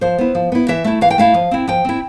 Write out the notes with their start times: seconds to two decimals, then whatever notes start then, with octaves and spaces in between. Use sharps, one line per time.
0.01 F3 C5
0.18 B3 E4
0.35 F3
0.52 B3 E4
0.68 E3 E5
0.84 A3 E4
1.01 E3 F5
1.11 G5
1.18 A3 E4 F5
1.34 F3
1.51 C4 E4
1.68 F3 G5
1.85 C4 E4